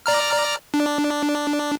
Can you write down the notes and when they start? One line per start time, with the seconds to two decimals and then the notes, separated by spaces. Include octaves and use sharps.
0.06 D5 A#5 F6
0.74 D4